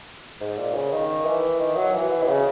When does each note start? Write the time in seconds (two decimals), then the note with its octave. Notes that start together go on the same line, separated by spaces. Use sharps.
0.40 G#2
0.58 A#2
0.74 C#3
0.92 D#3
1.25 E3
1.60 D#3
1.77 F#3
1.94 E3
2.23 B2
2.28 C#3